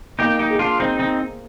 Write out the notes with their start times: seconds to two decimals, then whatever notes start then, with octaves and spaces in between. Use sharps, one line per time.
0.19 A#3 D#4 G4
0.39 D#4 G4
0.50 G#4
0.59 D4 F4
0.79 C4 D#4 C5
0.99 C4 D#4